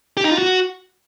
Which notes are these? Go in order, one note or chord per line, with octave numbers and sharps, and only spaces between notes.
G4
D#4
F4
F#4